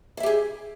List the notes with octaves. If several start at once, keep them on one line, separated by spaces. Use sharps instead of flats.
E4 G4 G#4 E5